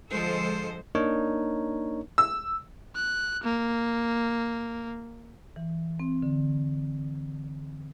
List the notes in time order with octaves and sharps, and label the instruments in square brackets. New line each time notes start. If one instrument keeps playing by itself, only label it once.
[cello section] D3 F3 G#3 A4 C5
[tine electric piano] A#3 D4 D#4 A#4 C#5
[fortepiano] E6
[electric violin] F#6
A#3
[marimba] E3
C4
D3